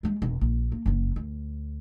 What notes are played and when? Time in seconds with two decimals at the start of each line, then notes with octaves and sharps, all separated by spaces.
0.03 G3 G#3
0.22 E1 F2
0.41 A#1
0.72 A#3
0.86 F#1 F#2
1.16 D2